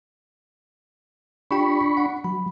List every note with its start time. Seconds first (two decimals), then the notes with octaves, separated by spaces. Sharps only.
1.51 D4 F4 G4 G5 B5 C#6
1.97 F#5
2.24 F#3 B5